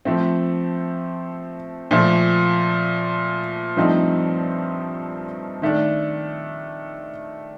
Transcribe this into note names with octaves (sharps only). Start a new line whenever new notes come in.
F3 A3 C4
A#2 F3 A3
G2 F3 A3 C4 D#4
D#3 A3 D4